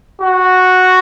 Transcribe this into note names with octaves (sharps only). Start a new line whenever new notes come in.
F#4